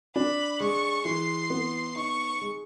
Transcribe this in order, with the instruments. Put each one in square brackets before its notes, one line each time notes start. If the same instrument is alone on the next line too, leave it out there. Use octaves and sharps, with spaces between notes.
[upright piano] D4 [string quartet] B5
[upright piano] G#3 [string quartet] C#6
[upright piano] E3 [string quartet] C6
[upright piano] B3
[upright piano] D#4 [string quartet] C#6
[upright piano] G#3